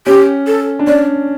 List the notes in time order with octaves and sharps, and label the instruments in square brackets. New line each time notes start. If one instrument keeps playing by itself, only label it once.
[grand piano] C#4 [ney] G4
[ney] A4
[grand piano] D4
[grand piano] C#4 [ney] D5